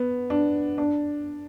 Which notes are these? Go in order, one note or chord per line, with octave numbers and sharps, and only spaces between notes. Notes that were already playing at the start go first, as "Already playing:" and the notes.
Already playing: B3
D4
D4